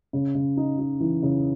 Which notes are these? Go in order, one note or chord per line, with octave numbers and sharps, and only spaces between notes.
C#3
C#3
D#4
D#4
E3
C#3